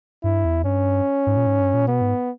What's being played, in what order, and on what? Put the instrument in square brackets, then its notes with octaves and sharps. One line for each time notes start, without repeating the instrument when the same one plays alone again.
[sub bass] G2 [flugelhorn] E4
[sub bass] E2
[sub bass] G2 [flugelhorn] C#4
[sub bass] G#2
A#2
G#2
G2
A#2
[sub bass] B2 [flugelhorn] B3
[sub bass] G#2